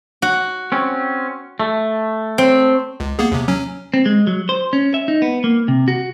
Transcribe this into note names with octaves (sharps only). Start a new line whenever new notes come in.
F#4
C4 C#4
A3
C4
C#2
A#3 B3 G#4
D#2 C3
F#3 C#4
C4
G#3
F#3
C5
C#4
E5
D#4
B3
A#3
C3
F#4